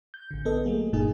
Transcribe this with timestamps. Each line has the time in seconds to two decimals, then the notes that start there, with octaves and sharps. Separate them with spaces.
0.14 G6
0.31 A1 D3
0.45 B3 A4 D#5
0.65 F#3 A3 A#3 G#4
0.93 G1 A#2 G#3 A#3 D#4 G#4